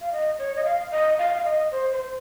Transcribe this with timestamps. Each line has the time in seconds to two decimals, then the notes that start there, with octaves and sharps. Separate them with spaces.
0.01 F5
0.12 D#5
0.39 C#5
0.56 D#5
0.65 F5
0.91 D#5
1.19 F5
1.37 F5
1.45 D#5
1.72 C5
1.92 C5